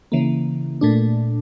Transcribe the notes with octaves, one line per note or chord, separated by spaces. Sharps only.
C#3 E3 A#3
A#2 A3 D4